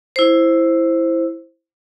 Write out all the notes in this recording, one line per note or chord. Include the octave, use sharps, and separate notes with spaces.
E4 C5